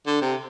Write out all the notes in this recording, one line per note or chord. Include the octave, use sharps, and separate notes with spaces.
D3
C3